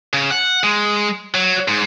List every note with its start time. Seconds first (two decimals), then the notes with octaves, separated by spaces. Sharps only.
0.13 C#3
0.31 F#5
0.64 G#3
1.34 F#3
1.68 G#2